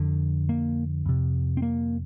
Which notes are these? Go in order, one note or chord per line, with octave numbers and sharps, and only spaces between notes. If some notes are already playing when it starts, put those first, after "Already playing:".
Already playing: F2 D3
A#3
F2 C3
C4
A#3